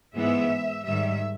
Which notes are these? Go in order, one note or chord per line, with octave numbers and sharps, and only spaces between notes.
G#2 E3 G#3 B3 E5
G#2 D#3 G3 E5